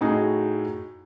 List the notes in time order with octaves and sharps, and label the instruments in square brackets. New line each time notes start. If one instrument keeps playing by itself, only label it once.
[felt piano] A2 D#4 F#4 G#4